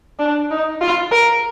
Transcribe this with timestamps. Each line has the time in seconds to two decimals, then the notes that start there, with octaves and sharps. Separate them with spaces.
0.19 D4
0.51 D#4
0.81 F4
1.11 A#4